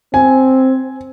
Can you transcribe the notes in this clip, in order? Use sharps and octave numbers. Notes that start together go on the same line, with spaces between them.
C4 G#5